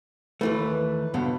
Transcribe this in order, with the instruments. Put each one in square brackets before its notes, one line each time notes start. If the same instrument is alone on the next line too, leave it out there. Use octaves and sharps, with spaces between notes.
[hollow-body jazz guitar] D#2 E3 A3 [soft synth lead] B4
[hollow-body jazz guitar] C#2 G2 B2